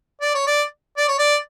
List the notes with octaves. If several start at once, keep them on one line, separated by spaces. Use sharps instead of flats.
D5
C#5
D5
D5
C#5
D5